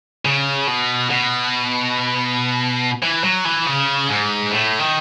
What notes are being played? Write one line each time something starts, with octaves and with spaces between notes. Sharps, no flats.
C#3
B2
B2
E3
F#3
E3
C#3
G#2
A2
D#3